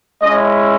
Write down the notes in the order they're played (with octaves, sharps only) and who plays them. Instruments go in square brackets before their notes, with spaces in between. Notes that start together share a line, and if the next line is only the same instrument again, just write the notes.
[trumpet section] G#3 C#4 E4 D#5